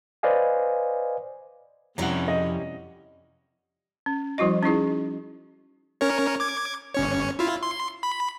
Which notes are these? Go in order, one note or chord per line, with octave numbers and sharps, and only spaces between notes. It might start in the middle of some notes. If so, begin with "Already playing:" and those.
B4 C5 D5 D#5 F5 G#5
F2 C3 G3 C#4 E4 F#5 A#5
D#5
C#4
F3 G3 E4 F#4 D#5
C#4 D#4 E4 G#4
C#4 A#4 C#5
D6 G#6
G1 C#4 C#5
E4 F4
C6
B5